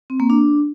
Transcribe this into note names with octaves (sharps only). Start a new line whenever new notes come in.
C4
A#3
D4